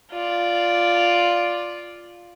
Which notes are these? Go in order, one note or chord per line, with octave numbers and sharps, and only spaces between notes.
F4 D5